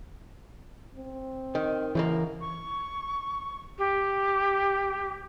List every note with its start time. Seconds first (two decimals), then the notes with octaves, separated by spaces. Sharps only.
0.95 C4
1.55 D#3
1.95 C#2 F#2 E3 A#3
2.40 C#6
3.78 G4